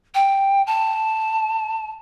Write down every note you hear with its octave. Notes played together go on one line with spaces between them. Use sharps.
G5
A5